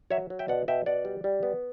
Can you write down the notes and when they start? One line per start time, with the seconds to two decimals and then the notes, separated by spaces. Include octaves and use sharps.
0.10 F#3 C#5 E5
0.30 F#3
0.39 E5 G5
0.48 B2 D5 F#5
0.68 B2 E5 G5
0.86 B2 D5 F#5
1.05 G3
1.24 G3
1.43 B3